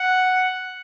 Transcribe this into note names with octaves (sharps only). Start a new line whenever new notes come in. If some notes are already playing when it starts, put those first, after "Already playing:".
Already playing: F#5